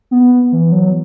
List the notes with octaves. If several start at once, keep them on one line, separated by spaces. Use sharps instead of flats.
B3
E3
F#3